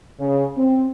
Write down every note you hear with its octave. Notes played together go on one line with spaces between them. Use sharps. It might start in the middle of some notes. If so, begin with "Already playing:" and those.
C#3
C4